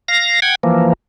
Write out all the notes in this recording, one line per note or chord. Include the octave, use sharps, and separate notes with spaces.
F5 A#6
F#5 G5 G#6
E3 F3 A#3